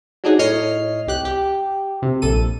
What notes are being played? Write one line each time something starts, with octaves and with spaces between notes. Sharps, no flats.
F#3 D4 D#4 G#4
A2 C#5 D#5 F6 C7
C2 G4 F#6
G4
C3
A#1 A4 D#7